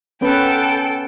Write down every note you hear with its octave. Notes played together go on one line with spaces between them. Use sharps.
B3 C#4 A4 B4 G5